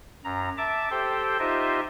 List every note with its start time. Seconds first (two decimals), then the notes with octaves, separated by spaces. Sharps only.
0.24 F#2 A#5
0.57 E5 A5 D6
0.90 G4 A4 C5 G5
1.39 D#4 F4 G4 C5 D#5 E5